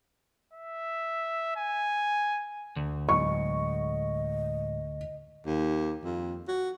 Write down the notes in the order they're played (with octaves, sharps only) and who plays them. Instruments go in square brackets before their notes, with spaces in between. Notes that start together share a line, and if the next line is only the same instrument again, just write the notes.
[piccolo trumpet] E5
G#5
[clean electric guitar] D2
[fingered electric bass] A2 F#3 G#3 [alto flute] D#5 [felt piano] C#6
[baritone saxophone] D#2
F2
F#4